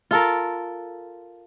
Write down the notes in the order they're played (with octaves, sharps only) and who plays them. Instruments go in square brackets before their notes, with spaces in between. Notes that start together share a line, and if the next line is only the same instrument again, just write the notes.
[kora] F4 A4 A#4